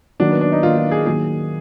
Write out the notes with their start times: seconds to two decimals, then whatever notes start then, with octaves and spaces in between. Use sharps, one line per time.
0.20 D#3 F#3 A#3 D4
0.31 B3
0.41 D4
0.52 D#4
0.63 D#3 F#3 A#3 F4
0.77 F4
0.91 G#4
1.06 D#3 F#3 A#3 G#4